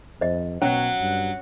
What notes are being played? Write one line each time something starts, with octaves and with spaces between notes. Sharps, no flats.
F2 C5 D#5
B2 F#3 C#4 F#5
G2